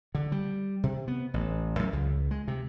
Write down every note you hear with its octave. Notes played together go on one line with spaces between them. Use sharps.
D3
G3
C3
B3
A1
F#2
C#2
G#3
C3